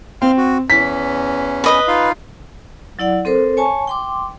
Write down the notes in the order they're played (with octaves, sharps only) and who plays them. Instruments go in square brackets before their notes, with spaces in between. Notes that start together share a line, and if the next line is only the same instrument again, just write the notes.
[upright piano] C4 [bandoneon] F5 C6 F6
[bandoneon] F#4
[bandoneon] E2 E3 C#4 [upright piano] B6
[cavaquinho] B4 D#5 B5
[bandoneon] D#4 F4 F5
[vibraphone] F#3 E4 D5 F#5
C4 A4 A#4 C5
C#5 G#5 A5 C#6
G5 C6 D6